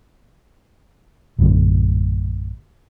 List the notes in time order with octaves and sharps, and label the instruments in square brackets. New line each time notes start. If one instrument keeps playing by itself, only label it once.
[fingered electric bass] A#1 F#2 A2 D3